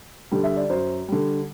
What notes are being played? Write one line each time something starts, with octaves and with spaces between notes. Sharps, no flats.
D3 G3
E5
D5
F#2 C5
D3 G3